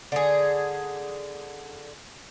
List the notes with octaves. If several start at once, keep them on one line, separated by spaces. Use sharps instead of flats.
D3 G#4